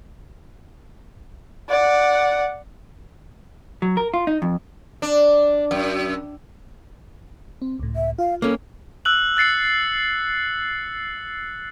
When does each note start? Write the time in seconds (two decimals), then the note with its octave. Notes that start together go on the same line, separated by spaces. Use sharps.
1.69 D5 F#5
3.82 F#3
3.97 A#4
4.14 F4
4.27 D#4
4.42 F2
5.02 D4
5.71 F#2
7.62 C4
7.79 C#2 A2
7.96 E5
8.18 F4 F5
8.42 A#3 C#4 A4
9.05 E6 F#6 F#7
9.37 F#6 A6 C7 C#7 F#7